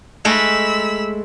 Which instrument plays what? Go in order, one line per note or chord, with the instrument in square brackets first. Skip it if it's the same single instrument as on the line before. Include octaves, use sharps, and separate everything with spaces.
[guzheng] G#3 A3 [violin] B5 E6